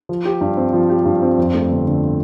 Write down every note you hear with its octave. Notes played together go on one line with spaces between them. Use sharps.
F3
G4
G2
C4
F3
G4
G2
C4
F2
A3
G1
D3